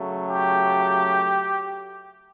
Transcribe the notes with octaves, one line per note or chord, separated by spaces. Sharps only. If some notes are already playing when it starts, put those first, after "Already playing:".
Already playing: C#3 F#3 A3
G4